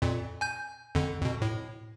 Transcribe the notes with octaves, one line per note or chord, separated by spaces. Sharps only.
F2 A#2
G#5 G6
F2 D3
F2 B2
A2